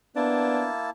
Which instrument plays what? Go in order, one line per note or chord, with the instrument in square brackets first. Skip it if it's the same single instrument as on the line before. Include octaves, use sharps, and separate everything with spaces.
[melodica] A#3 E4 A5 [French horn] B3 [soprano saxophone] D4